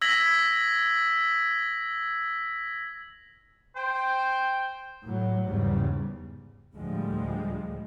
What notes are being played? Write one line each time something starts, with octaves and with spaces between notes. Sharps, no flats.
E6 G#6 A#6 B6 F#7
C5 G5
A2 F#3
E2 G#2 C#3 G3
D2 A2 F3 G3 G#3